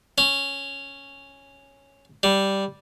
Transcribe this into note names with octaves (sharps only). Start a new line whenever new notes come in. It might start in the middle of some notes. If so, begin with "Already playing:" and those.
C#4
G3